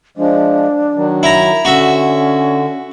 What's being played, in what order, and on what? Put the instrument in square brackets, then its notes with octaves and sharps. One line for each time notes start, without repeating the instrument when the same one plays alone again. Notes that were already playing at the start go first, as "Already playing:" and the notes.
[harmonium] F3 G#3 [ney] D4
[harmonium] D#3 F#3
[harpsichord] E4 A#5
[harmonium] D3 [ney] C#4 [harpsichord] F#4 E5